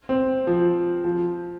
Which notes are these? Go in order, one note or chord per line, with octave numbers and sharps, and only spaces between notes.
C4
F3
F3